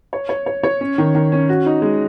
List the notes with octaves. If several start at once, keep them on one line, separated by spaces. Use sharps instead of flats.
C#5
C#5
C#5
C#5
C#4
D#3
D#3
C#4
F#4
D#4
G#3